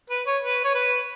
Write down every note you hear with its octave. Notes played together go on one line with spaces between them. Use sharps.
B4
C#5
B4
C#5
B4